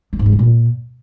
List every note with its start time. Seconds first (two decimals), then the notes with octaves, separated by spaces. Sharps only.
0.13 F#3
0.19 G#2
0.26 G#3
0.32 C#3
0.39 A#2